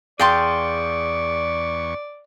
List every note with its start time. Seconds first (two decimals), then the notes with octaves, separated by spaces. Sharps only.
0.20 E2 G#4 D5 F5 G5 A5 C6 C#6